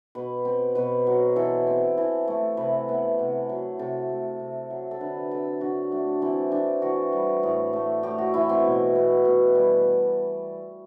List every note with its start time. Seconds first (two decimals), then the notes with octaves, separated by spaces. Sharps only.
0.15 B2 B4
0.45 C4
0.75 B2 B4
1.07 F#3
1.36 E3 A4
1.67 C4
1.98 E3
2.28 A3
2.57 C3 B4
2.89 B3
3.19 C3
3.49 F#3
3.79 C3 A4
4.09 A3
4.40 C3
4.70 F#3
4.91 A4
5.01 D3 B4
5.31 C4 A4
5.61 D3 F#4
5.92 A3 D4
6.22 E3 C4
6.52 C4 D4
6.82 E3 F#4
7.13 G3
7.43 A2
7.73 A3
8.03 A2 G4
8.18 F#4
8.34 E3 E4
8.49 C4
8.65 B2
8.95 B3
9.25 B2
9.55 G3